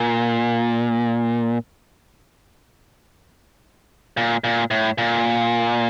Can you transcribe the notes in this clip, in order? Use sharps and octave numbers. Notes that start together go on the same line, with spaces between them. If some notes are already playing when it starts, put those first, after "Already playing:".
Already playing: A#2
A#2
A#2
A2
A#2